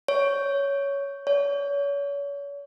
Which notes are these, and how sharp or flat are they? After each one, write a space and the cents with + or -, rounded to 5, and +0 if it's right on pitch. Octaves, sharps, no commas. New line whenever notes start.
C#5 +10
C#5 +35